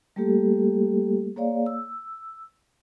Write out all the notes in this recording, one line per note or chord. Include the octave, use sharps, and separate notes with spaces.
G3 A3 A#3 G4 A4
A#3 G#4 C#5 D5 F5
E6